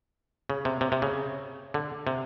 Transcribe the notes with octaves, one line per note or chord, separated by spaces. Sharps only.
C#3
C3
C3
C3
C#3
D3
C3